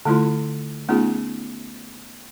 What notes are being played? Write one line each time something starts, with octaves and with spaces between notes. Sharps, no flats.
D3 A3 E4 F4 C6
A3 B3 C#4 D#4 F4 G#4